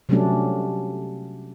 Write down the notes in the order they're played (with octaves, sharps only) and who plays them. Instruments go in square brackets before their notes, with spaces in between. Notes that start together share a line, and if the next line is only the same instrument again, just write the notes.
[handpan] C3 F#3 G3 A3 C#4 D4